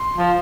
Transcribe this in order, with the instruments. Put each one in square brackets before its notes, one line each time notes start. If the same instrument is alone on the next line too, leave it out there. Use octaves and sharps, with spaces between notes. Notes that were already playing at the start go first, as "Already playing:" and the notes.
Already playing: [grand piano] C6
[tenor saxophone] F3